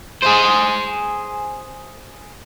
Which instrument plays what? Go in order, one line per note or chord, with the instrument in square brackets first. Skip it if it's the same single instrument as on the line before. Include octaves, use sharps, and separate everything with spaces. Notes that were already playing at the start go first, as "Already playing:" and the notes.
[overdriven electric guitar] G#4 C5